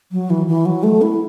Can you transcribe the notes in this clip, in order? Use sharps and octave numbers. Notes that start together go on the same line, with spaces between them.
F#3
E3
E3
F#3
A3
E4